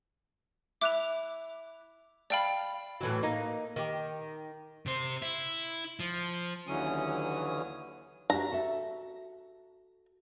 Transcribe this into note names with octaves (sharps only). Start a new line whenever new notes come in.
E4 D6 F#6 F7
D5 F5 G5 A5 B5
A2 E3 F#3
A#3 D#4
D#3 G4
C3 C5
E4
F3
D#2 D3 E3 F#3 C#4 D#6
D4 F#4 G4 A#5
F#4 A4 E5